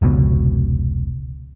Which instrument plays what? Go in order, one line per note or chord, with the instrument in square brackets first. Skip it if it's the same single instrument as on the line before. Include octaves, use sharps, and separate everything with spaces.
[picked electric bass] F1 C#2 B2